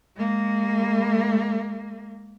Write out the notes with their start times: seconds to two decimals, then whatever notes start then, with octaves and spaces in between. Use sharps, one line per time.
0.16 G#3 A#3